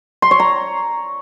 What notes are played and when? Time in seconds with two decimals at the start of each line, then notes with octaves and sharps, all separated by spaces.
0.22 C6
0.31 C#5
0.40 A#5